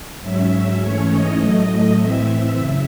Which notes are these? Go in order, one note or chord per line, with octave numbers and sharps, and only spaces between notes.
G#2 F#3 C#4 E5
E5
G#2 E3 A3 C#4 C#5
D#5
A2 F#3 A3
A2 E3 C4 E5
E5
F#2 C#3